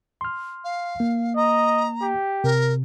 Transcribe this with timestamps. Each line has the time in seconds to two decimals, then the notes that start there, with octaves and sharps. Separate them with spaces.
0.21 C6 F6
0.64 F5
1.00 A#3
1.36 D#5 A#5
2.01 G4
2.44 C3 A#4